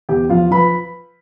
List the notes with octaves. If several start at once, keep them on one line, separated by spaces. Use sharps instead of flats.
E2 G4 G5
F3 F4 F5
F3 B4 B5